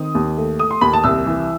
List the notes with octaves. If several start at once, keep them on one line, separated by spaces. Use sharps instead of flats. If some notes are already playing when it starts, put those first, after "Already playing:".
Already playing: D#3 C4 D#6
D#2
A3
A3 D#6
C6
D#2 B5
A5
C2 E6
E3